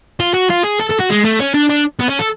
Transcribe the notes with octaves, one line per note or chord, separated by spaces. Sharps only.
F4
F#4
F4
G#4
A4
A4
F#4
G#3
A3
C#4
D4
D4
B3
C#4
A4